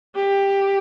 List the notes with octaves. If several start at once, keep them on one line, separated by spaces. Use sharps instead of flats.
G4